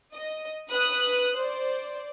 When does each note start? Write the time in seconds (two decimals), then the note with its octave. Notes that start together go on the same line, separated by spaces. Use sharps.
0.14 D#5
0.68 B4 D#6 F#6
1.37 C5 D5